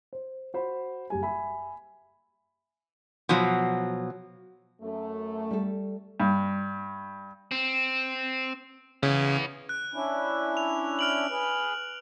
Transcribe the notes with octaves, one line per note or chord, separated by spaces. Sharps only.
C5
F#4 C5 B5
F#1 G3 G#5
E5 G#5 B5
B2 F3 F#3
F#2 A3
G3 A4
G2
C4
C#3 B3 E4
F#6
C#4 D4 E4
F7
F6 D7 F#7
G#4 B4